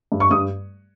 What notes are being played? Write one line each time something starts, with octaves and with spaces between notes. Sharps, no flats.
G2
C#6
G2 D#6